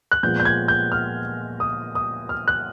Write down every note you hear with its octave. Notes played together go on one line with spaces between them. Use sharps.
F#6
A#2 F3 G#3 B3 G6
G6
G#6
G6
F6
D#6
D#6
F6
F#6